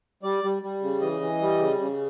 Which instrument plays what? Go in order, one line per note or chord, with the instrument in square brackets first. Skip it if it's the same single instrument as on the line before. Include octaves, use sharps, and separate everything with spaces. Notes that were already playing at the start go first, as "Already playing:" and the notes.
[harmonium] G3 D5
G3
G3
C#3
E3 D#5
E3
G3
C#3
C#3